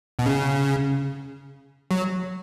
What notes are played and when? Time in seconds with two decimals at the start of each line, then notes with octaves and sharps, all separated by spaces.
0.19 B2
0.26 C#3
1.91 F#3